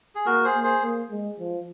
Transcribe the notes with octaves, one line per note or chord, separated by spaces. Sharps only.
G#4
A#3 F#4 A#4
G#4 C5
A#3
G#4 C5
A#3
G#3
F3